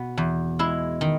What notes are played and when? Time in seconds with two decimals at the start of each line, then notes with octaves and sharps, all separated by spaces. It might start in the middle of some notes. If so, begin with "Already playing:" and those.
Already playing: B2 B3
0.17 E2
0.59 G#3 E4
1.01 D#3